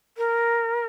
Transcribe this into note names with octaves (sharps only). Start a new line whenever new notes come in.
A#4